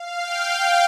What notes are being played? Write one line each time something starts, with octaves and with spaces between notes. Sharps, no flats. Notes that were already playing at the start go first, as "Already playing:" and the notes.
Already playing: F5
G5